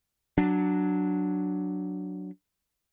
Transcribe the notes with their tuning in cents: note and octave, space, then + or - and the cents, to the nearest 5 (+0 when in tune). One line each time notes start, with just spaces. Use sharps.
F#3 +0 D4 +0